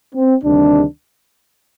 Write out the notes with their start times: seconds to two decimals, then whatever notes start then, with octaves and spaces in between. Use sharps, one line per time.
0.15 C4
0.44 D2 C3 D#3 G3 D4